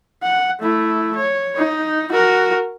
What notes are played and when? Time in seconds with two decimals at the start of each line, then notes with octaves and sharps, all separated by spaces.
0.23 F#5
0.61 A3 E4
1.16 C#5
1.57 D#4
2.12 F#4 A#4